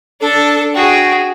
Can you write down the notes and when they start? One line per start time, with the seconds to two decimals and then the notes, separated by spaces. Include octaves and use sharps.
0.21 D4 A4
0.75 F#4 G#4 G5